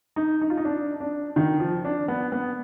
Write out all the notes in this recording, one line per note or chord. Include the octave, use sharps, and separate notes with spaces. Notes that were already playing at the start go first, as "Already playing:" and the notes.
D#4
D#4
F4
D#4
D4
D4
D#3
F3
D4
B3
B3